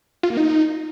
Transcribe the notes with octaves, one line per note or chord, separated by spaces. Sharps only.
F4
A#3
D#4